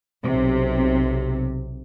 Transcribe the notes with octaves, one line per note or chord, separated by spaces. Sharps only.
B1 C3